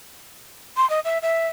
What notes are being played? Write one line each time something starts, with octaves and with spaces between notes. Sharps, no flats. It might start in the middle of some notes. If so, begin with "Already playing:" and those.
C6
D#5
E5
E5